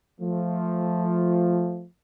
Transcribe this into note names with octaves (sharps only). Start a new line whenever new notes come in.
F3 A3